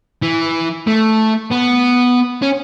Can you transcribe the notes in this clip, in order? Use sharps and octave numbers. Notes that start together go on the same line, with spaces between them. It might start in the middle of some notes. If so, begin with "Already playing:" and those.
E3
A3
B3
C#4